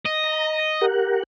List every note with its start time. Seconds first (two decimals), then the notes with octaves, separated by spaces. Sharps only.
0.06 D#5
0.24 A#5
0.81 G4 A#4 F#5